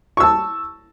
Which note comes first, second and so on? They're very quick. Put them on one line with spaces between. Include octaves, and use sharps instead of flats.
C#6 E6 A5